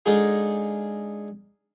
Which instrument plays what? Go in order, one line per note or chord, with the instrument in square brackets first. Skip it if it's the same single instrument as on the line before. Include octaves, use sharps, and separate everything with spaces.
[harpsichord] D3 G#3 D#4 F4 G#4